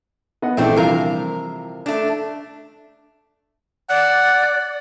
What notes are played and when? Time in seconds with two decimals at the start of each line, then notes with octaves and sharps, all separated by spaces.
0.42 B3 D#5 F#5
0.57 A#1 E3 A3 C4 D4
0.77 C3 E3 F3 G3 A#4 F5
1.86 A3 D4
3.90 D5 F#5